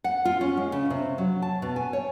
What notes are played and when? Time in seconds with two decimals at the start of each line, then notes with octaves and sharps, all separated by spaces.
0.04 F#5
0.25 F4
0.41 C#4
0.57 G#3
0.72 C#3
0.90 C3
1.18 F#3
1.42 A5
1.62 B2
1.76 G#5
1.93 C#5